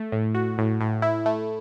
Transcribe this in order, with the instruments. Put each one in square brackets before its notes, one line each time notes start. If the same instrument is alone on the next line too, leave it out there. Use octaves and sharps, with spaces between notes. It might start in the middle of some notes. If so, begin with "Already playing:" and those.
Already playing: [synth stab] A3
A2
F#4
A2
A2
E4
A3